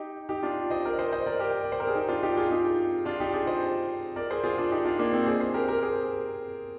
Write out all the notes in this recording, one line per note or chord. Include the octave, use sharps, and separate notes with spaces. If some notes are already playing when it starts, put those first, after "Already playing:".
Already playing: D#4 G4
D#4 G4
D4 F4
C5 D#5
A#4 D5
C5 D#5
C5 D#5
A#4 D5
G4 A#4
D5
C5
A#4
G#4
D#4 G4
D4 F4
D#4 G4
F4 G#4
D#4 G4
D4 F4
D#4 G4
F4 G#4
C5 D#5
A#4 D5
G#4 C5
F4 G#4
D4 F4
D#4 G4
D4 F4
A#3 D4
C4 D#4
G#4 C5
G#4 C5
G4 A#4
G4 A#4
G#4 C5